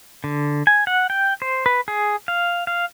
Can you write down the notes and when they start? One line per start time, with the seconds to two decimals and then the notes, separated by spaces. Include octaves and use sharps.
0.24 D3
0.67 G#5
0.87 F#5
1.10 G5
1.42 C5
1.66 B4
1.88 G#4
2.28 F5
2.67 F5